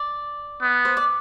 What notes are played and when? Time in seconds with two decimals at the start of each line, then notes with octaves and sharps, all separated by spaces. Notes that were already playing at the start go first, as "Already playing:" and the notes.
Already playing: D5
0.62 B3
0.85 C5
0.97 D5